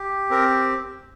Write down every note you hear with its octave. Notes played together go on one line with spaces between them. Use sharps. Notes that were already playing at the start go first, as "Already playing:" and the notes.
Already playing: G4
C4 A#4